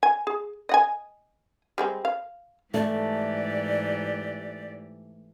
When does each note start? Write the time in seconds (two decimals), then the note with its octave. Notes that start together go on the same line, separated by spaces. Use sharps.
0.03 G#5
0.27 G#4
0.69 D#5 F#5 G#5
1.78 G3 G#3 C4
2.05 F5
2.74 G#2 E3 A3 G4 D5